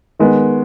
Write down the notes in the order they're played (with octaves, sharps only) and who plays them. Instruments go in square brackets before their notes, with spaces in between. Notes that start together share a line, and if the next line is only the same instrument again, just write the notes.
[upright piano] D#3 G#3 B3